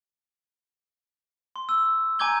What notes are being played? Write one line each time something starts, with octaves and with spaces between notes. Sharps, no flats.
C6
E6
G#5 A#5 D6 G6 G#6 G7